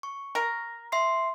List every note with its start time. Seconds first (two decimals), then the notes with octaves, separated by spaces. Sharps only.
0.03 C#6
0.35 A#4
0.92 E5 C6 C7